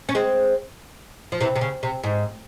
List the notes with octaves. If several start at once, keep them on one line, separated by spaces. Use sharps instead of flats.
C#4
G#3 C4
F3
C3 E3
C3
C#3
C3
G#2